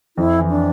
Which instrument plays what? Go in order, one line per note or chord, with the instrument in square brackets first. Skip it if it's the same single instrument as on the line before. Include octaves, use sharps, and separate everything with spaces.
[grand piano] F2 [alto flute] E4
[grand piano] E3
[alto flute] D4